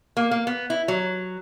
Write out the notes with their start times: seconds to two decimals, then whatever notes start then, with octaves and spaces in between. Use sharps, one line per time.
0.17 A#3
0.31 A#3
0.47 B3
0.70 E4
0.88 F#3